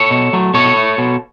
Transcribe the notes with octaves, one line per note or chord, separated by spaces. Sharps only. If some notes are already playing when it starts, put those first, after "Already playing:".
Already playing: A4 C#5
B2
F#3 A3
B2 A4 C#5
A3
B2